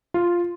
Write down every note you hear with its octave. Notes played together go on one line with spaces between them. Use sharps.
F4